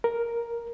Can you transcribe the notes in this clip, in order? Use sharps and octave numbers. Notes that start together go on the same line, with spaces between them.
A#4